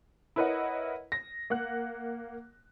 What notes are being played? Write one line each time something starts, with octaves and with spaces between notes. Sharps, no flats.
E4 A#4 B4 C#5 D#5 F#5
A#6
A#3 F#5 F#6